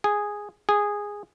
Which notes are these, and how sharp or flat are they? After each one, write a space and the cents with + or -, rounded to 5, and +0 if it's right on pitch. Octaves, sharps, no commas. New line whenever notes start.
G#4 -5
G#4 -10